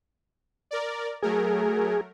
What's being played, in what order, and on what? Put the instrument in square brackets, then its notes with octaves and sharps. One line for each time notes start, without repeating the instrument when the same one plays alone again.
[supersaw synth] A#4 D5
[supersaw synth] F#3 A3 A#4 [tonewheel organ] G#4